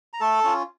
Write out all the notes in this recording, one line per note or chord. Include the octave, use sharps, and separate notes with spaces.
A#5
A3 A4 A5
C#4 F4